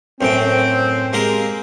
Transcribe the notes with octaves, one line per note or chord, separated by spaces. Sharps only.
F#2 A2 C4 G5
G#3 A#3 G4